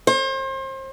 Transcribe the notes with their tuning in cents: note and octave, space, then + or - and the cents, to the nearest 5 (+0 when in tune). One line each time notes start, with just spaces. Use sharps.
C5 +35